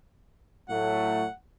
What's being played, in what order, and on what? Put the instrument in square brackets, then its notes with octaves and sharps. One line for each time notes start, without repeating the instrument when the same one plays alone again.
[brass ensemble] A2 F#3 A3 [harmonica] F#5